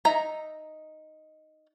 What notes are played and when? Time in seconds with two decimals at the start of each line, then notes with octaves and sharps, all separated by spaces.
0.05 D#4 E5 A#5